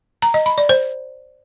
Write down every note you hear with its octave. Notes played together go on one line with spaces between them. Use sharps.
A#5
D#5
B5
D5
C5